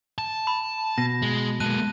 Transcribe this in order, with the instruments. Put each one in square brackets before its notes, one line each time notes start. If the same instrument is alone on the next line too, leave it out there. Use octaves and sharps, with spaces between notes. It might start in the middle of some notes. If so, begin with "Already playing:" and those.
[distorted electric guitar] A5
[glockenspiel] B5
[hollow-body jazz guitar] B2 [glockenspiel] A#6
[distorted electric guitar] G#3
[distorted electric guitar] G#3 A#3 [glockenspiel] A5 F#6 D#7